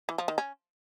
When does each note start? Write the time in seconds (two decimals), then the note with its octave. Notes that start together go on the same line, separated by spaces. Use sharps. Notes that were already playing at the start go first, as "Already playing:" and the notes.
0.09 E3
0.18 F3
0.28 D#3
0.38 C#4